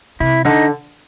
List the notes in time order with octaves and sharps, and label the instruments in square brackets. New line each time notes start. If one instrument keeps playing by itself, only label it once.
[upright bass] C3 [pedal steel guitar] E4
[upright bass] D3 [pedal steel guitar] D#4